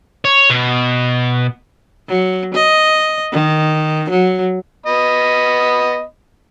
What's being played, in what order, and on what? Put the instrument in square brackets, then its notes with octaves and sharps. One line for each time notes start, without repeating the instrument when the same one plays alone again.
[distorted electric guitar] C#5
B2
[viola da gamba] F#3
D#5
D#3
F#3
[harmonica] B3 D#5 B5